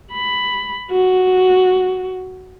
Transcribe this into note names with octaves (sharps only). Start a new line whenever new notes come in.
B5
F#4